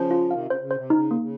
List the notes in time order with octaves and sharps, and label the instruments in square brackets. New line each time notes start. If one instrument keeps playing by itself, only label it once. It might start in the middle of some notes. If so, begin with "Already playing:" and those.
Already playing: [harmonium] C#3 F3 [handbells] C5
[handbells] F4
[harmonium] C3 D#3 [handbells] F5
[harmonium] C#3 [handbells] C5
[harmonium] C#3
[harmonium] C3 [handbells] C5
[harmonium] C#3 [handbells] D#4
[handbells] A#3
[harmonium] C#3